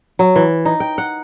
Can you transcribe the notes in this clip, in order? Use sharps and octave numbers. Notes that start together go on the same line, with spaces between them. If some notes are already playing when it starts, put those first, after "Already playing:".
F#3
E3
D#4
G5
F#5